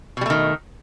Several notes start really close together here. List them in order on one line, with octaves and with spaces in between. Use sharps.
B2 G3 A3 D#3